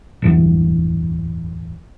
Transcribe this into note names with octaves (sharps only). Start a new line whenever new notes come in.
D1 G1 E2